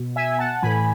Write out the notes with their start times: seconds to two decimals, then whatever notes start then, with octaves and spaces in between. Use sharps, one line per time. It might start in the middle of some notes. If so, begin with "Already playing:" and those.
Already playing: B2
0.16 E5 G#5
0.39 F#5 A5
0.62 A2 E3 G#5 B5